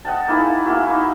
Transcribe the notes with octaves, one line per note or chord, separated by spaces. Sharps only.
D#5 F#5 G5 A5
A#3 D#4 E4 G#4
A#3 E4 F#4
D#4